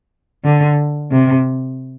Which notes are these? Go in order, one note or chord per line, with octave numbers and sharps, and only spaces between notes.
D3
C3